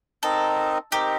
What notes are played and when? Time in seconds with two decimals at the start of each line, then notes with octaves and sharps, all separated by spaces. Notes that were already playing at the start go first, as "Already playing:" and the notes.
0.23 C4 D#4 A4 A#4 D#5
0.92 C4 D#4 G4 A#4 D#5